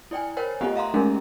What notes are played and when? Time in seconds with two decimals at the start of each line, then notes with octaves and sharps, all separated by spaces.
0.11 E4 D5 G5 G#5
0.37 A#4 C5 C#5 G5
0.61 A3 B3 F4 G4 D#5 F#5
0.75 E5 F5 A#5 C6
0.94 G#3 A3 C#4 D#4 G#4 A#4